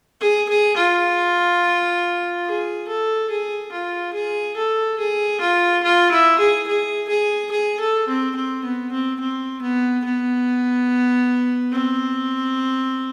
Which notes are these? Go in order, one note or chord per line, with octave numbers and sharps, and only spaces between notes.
G#4
G#4
F4
G#4
A4
G#4
F4
G#4
A4
G#4
F4
F4
E4
G#4
G#4
G#4
G#4
A4
C4
C4
B3
C4
C4
B3
B3
C4